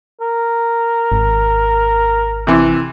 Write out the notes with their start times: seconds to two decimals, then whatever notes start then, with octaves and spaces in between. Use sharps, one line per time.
0.21 A#4
1.12 G#1
2.47 C3 E3